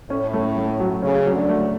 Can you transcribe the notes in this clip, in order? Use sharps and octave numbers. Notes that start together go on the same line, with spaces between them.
A2 C#4
A3
A3
F#3
C#3 C#4
F#3
D2 D3
A3